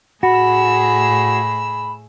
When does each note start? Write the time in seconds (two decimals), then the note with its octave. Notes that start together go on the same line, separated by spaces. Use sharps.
0.23 A2 F#4 G#4 B5 E6